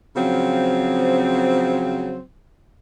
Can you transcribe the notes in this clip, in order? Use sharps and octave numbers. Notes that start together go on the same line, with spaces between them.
C#3 F3 F#3 C4